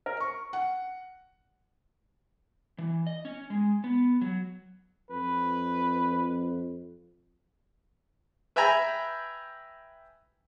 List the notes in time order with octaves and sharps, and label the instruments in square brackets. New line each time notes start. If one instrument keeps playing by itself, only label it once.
[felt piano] A#4
C#6
F#5
[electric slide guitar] E3
D#5
C#4
G#3
B3
F#3
[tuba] F2 [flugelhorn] B4
[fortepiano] B4 E5 G5 G#5 A#5 B5